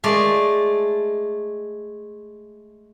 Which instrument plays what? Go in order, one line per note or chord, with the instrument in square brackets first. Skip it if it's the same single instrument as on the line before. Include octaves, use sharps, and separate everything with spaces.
[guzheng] G#3 A3 D5